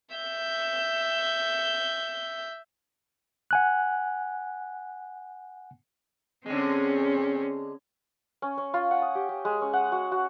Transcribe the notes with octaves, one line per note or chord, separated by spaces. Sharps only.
E5 G6
F#5 G#5 F#6
D3 G#3 C4 C#4
C#4
C#4
F4
F#5
D#6
G4
G4
G#3
C#4
F#5
F#4
F#4